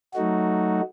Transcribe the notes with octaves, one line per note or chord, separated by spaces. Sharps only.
F#3 A3 D#4 F#4